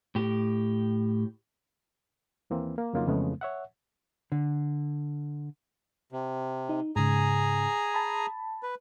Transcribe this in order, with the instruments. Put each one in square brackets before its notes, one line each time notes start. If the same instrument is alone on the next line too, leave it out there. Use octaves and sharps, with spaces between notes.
[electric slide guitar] A2 G4
[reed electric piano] D#2 E3 A#3 C4
A#3
F2 C#3 F#3 A#3 D#4 F4
F2 C#3 E3 G#3 A3 B3
C#5 E5 F#5
[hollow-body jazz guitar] D3
[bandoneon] C3
[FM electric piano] D#4
[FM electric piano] G#2 C#3 [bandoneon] G#4 G#5 A#5
[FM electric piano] A5 B5
[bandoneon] B4